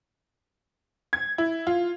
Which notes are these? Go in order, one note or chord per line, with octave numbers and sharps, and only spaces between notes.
G#6
E4
F4